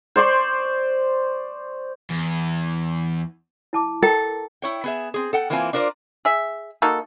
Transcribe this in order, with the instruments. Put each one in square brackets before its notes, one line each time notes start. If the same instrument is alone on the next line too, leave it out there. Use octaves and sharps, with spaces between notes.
[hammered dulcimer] C5 D5 C6 C#6
[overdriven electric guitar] E2
[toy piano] E4 A5 D6
[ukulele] A4 [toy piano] A#4 G5 A#5
[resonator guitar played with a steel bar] E4 C#5 G5
B3 G#4 E5
C4 G#4
A4 F#5 G5
E3 A#3 C4 E4 F4 G#5
D4 F4 A#4 C5 D5
[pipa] G#4 E5
A#3 D#4 F#4 A4